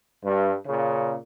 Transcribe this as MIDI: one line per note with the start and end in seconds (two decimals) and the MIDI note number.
0.25 0.53 43
0.66 1.16 46
0.66 1.16 49